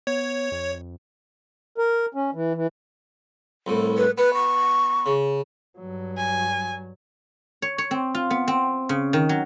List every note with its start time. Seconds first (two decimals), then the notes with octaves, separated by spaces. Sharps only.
0.07 B3 C#5
0.52 F2
1.78 A#4
2.14 C#4
2.34 E3
2.55 E3
3.67 C2 A2
3.98 B4
4.18 B3 B4
4.34 C#6
5.06 C#3
5.79 G2 F#3
6.18 G#5
7.62 C#5
7.78 C#5
7.91 C4
8.15 F4
8.30 B3
8.48 C4
8.89 C#3
9.13 D#3
9.29 F#3